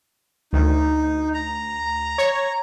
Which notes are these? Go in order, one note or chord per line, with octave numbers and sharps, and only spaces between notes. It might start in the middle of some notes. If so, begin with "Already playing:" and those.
D2 D#4
A#5
C#5